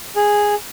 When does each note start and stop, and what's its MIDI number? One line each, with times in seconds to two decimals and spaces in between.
0.16 0.55 68